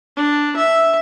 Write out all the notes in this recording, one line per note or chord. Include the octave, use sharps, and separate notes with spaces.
D4
E5